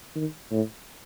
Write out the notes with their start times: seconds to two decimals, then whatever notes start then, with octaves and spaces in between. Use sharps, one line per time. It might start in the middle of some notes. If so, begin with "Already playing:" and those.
0.15 D#3
0.51 A2